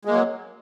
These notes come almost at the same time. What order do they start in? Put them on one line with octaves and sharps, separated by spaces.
G#3 A#3 F#3